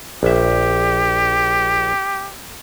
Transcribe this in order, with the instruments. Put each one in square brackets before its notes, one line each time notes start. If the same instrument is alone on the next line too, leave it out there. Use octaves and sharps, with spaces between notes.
[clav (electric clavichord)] A#1 E5 [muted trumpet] G4